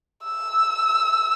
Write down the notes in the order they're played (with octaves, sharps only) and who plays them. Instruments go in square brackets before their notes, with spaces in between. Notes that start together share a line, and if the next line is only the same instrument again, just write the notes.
[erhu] E6